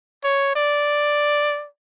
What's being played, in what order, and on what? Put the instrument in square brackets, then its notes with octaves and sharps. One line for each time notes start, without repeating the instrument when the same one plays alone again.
[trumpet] C#5
D5